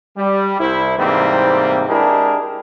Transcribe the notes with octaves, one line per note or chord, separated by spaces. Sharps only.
G3
C2 E4 C5
G#2 C3 E3 G3 A#3 C4
G#3 D4 E4 G4 G#4 A#4